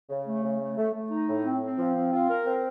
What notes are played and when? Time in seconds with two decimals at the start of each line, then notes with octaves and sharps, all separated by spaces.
0.10 C#3
0.27 A3
0.44 C#3
0.60 A3
0.77 A3
0.94 A3
1.11 D#4
1.28 A2
1.44 C4
1.62 C4
1.78 F3
1.95 C4
2.12 F4
2.29 A#4
2.46 C4